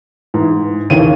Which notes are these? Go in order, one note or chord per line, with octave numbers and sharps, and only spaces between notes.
G#2 E3
D#2 C#3 E3 D#7